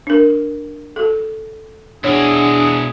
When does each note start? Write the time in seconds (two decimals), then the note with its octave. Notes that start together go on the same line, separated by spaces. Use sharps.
0.07 D4 A#4
0.96 F#4 A4
2.04 B2 D4 E4 F#4 G#4 C#5